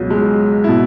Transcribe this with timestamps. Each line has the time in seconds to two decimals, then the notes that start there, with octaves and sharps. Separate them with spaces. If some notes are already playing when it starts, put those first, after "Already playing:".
Already playing: C#2 B2 F#3
0.10 G#3
0.64 B2 E4